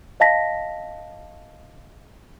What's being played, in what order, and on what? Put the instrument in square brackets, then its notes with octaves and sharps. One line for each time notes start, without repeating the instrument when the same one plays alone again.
[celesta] D#5 F5 A5 A#6 B6